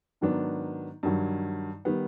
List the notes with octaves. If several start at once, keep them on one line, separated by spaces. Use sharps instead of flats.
G#2 D#3 F#3 B3 D4
G2 D#3 F#3
D#3 G3 B3